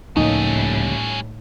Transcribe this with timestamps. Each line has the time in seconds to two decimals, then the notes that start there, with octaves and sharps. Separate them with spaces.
0.17 C#2 A2 F3 G3 A#3 C#4 D#4